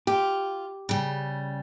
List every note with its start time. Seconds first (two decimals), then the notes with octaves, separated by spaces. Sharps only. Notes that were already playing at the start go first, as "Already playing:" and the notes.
0.07 F4 G4
0.89 C#3 G3